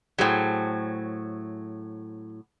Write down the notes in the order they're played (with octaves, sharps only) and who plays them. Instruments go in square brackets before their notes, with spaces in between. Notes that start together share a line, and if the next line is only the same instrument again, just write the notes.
[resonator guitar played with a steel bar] A2 F#3 [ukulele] G#4 C5 G5